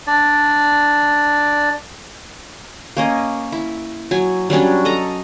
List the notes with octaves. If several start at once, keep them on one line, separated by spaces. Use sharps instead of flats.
D4 D5
A#3 C#4 D#5
E4
F#3 G#5
F#3 G3 C#4 D4
A4 D#5 A#5